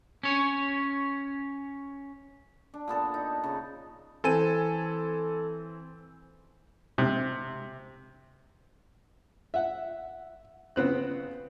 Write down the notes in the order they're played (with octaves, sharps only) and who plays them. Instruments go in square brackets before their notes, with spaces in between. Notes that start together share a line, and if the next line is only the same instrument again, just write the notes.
[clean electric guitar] C#4 C#5
[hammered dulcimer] D4
A#2 B3 A4 A5
D#4
C#3
[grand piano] E3 C4 [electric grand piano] A4 G#5 D#7
[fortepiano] C3
E5 F#5
C#3 B3 C4 F#6